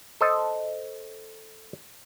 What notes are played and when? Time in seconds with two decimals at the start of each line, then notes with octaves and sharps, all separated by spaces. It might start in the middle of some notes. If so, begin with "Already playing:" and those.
0.21 A4 C5 D#5 A5